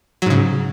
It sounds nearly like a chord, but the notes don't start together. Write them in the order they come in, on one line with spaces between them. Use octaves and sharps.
F#3 G#2 C#3